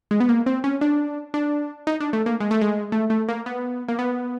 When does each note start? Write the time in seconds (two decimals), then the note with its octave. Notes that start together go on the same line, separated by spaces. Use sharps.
0.11 G#3
0.20 B3
0.29 A#3
0.46 C4
0.64 C#4
0.81 D4
1.34 D4
1.87 D#4
2.00 D4
2.13 A3
2.26 A#3
2.40 G#3
2.51 A3
2.62 G#3
2.92 A3
3.10 A3
3.29 A#3
3.46 B3
3.88 A#3
3.99 B3